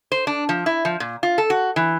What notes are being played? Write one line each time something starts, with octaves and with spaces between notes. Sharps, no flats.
C5
D4
F3
E4
F3
A#2
F4
A4
F#4
E3